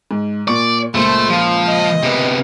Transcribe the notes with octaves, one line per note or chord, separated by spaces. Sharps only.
G#2
A#2 D5 C#6
C#2 A#2 A3 C5
F3
D#5
C3 B3